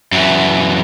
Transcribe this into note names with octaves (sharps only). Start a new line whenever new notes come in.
F#2 E3